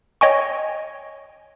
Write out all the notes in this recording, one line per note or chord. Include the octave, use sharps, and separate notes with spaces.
C#5 D#5 G5 G#5 C#6